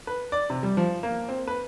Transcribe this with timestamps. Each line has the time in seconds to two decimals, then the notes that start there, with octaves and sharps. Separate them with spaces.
0.07 B4
0.32 D5
0.50 C3
0.63 G3
0.77 F3
1.03 A#3
1.29 C4
1.48 B4